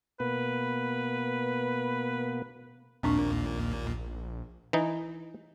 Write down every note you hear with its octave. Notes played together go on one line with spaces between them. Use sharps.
B2 A#3 B3 B4
A#1 D#2 A#2 A#3 C4 D4 C#6
E3 D#4